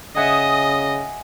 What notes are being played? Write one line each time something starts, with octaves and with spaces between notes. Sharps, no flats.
C#3 D#5 E5 F#5 G#5 D#6